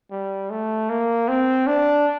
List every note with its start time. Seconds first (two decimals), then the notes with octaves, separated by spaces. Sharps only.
0.11 G3
0.50 A3
0.90 A#3
1.28 C4
1.67 D4